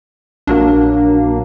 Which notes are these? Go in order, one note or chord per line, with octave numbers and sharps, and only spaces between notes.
A#1 F#3 A#3 D4